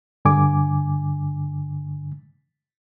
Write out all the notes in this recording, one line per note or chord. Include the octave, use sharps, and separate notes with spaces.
G2 D3 G#5 D6